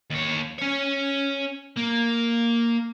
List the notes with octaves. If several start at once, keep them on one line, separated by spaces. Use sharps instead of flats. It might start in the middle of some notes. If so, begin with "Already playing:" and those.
D#2 C#5
C#4 C#5
A#3